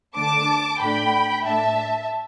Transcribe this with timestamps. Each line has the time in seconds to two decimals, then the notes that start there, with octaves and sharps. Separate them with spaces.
0.16 D3 A3 D4 A5 D6
0.80 A2 A3 D4 G5 B5
1.46 A2 A3 D4 E5 A5